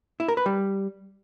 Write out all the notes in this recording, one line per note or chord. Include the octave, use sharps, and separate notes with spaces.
E4
A#4
B4
G3